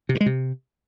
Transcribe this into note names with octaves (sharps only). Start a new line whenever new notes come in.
C3
G2
G#3
C3